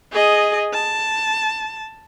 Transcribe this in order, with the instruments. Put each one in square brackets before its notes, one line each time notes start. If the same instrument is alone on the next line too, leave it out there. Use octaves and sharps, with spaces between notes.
[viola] G#4 D#5
A5